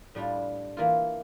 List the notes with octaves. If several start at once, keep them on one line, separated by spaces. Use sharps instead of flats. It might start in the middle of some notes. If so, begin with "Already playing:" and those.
A2 G3 D4 F4
E3 A#3 F4